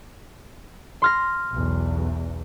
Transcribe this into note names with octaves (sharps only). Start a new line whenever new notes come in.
C6 F6 A#6
B1 E2